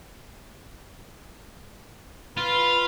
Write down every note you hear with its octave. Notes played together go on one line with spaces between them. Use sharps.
F4 B4 B5